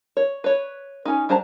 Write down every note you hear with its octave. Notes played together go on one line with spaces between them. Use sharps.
C#5
B4 C#5
C#4 D#4
G3 D4 C5 A5 A#5